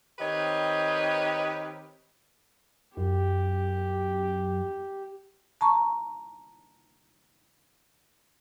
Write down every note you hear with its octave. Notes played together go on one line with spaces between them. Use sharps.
D#3 C4 G4 B4 C#5 D#5
F#2 G4
A5 A#5 C#6